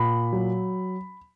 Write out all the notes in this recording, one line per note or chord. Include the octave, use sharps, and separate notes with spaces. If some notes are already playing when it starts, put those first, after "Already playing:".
Already playing: A#2 B5
F#3